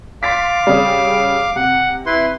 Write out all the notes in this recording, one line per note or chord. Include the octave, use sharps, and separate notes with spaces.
F5 C6 D6 A6 B6
C#3 G3
C3 F#5
E4 B4 C6